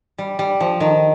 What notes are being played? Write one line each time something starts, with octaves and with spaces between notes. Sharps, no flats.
G3
G3
F3
D#3